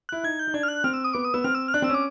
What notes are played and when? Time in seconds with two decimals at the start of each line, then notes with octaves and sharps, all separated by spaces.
0.09 E4 F#6
0.24 D#4 G#6
0.39 G6
0.47 D#4
0.54 D4 G#6
0.63 F6
0.68 F#6
0.84 C4 F6
0.94 E6
1.04 D#6
1.14 B3 D6
1.25 D#6
1.34 B3 E6
1.44 C4 F6
1.55 E6
1.68 F6
1.74 D4 F#6
1.82 C4 E6
1.89 C#4 D6